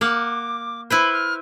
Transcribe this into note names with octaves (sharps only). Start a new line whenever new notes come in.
A#3 F5 F#5 D6
E4 B4 C5 B5
F6